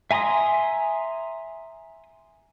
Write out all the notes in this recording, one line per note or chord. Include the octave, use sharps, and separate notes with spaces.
E5 G#5 A#5 C6 D#6